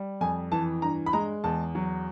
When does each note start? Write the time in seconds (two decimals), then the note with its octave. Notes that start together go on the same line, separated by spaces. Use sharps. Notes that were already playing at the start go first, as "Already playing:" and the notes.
Already playing: G3
0.21 F2 G#5
0.52 E3 A5
0.82 G2 A#5
1.06 B5
1.13 G#3 A#5
1.44 E2 A5
1.75 F#3